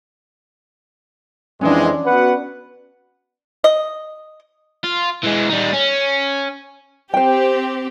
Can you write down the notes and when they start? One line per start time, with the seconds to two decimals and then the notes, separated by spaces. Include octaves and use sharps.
1.61 F2 E3 G#3 C#4 D4
2.06 B3 F#4 B4 F#5
3.64 D#5
4.84 F4
5.24 E3 G#3
5.50 G3 D#4
5.73 C#4
7.14 C4 G4 C5 G5